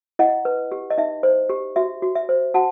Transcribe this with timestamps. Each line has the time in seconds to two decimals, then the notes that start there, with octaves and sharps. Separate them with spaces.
0.19 E4 D#5 F#5
0.45 B4
0.72 G4
0.90 D#5
0.98 D#4 E5
1.23 C5
1.50 G4
1.76 F#4 E5
2.02 F#4
2.15 E5
2.29 C5
2.54 F#4 F#5 A5